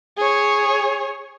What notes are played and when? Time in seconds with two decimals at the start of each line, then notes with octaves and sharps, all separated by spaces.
0.18 G#4 C#5